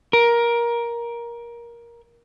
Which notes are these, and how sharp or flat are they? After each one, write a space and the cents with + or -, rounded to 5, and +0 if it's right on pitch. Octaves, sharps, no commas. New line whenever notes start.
A#4 +15